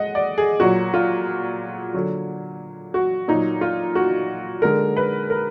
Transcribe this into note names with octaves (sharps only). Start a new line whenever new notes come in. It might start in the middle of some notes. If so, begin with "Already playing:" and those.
Already playing: G#3 D#5 F#5
D5
G#4
A#2 F#3 F#4
F4
D3 F#3
F#4
A#2 F#3 D#4
F4
F#4
D3 G#3 A#4
B4
A#4